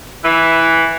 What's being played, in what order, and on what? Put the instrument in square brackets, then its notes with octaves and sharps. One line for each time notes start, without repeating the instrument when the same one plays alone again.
[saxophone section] E3